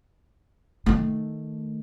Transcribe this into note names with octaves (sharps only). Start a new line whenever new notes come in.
D#3 A3